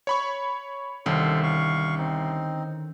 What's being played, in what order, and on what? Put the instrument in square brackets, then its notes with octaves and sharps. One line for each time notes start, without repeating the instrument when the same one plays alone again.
[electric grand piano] C#5 B5 C#6
[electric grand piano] C2 [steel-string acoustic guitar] D3 D#3 C#4 [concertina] A4 C5 F5
[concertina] F5 C#6
C4 D#4